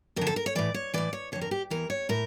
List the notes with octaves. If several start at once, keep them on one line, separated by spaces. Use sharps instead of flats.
F2 D3 A#4
A4
A#4
C#5
A2 E3 D5
C#5
A2 E3 D5
C#5
F2 D3 C#5
A#4
G4
E2 E3 A#4
C#5
A2 A#4